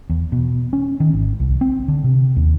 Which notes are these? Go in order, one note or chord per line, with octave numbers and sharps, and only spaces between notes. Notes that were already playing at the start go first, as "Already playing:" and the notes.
E2
B2
C#4
D#3
G#1
C2
C4
D3
C3
D#2